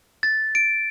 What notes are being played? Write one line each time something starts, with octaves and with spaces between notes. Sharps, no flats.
A6
D7